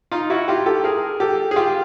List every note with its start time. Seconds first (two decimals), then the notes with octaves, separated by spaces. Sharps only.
0.11 D#4 F4
0.30 E4 F#4
0.48 F4 G4
0.66 G4 A4
0.84 G#4 A#4
1.20 G4 A4
1.51 G#4
1.56 F4 G4